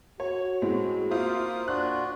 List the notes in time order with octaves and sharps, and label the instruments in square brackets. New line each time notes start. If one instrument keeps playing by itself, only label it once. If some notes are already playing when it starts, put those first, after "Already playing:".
[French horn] F#4 [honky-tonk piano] C#5
[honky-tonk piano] A2 G#3 C4
[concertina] A#3 C5 D#6 [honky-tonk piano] E4 F4
[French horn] A#2 [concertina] D4 F4 F#4 [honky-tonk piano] F#6